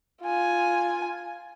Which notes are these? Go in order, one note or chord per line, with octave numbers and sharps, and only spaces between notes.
F4 G#5